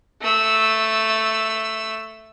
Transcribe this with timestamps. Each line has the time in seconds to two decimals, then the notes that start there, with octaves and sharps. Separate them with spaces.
0.21 A3 E6